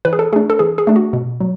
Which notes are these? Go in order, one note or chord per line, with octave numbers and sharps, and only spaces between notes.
E3 B4
G#4
A4
A3 D4 G#4
A4
E3 G#4
G#4
A3 D4
F#4
B2
F#3